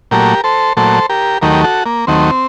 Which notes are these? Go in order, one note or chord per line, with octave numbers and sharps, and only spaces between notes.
A#2 F#3 A3 G4 A#4
A4 C5
A#2 F#3 A3 A4 C5
G4 A#4
D#2 D#3 F#3 A3 G4 A#4
F#4 A4
A#3
D#2 D#3 F#3 A3 C4